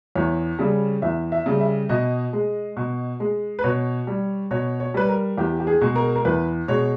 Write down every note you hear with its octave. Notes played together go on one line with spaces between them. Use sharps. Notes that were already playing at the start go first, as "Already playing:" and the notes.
E2 C#5
C#3 G3
E2 E5
E5
C#3 G3
E5
B2 D#5
G#3
B2
G#3
B4
B2 C#5
G3
B2 C#5
C#5
G3 B4
A#4
E2 G4
G4
G#4
B2 G#3
A#4
A#4
E2 B4
B2 G#3 C#5